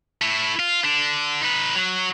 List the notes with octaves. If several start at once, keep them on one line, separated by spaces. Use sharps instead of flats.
A3 E4
F4
D3 D4
D#4 B4
F#3 F#4